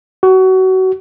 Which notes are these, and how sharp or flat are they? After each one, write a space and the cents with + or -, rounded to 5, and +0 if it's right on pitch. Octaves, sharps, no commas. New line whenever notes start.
F#4 +25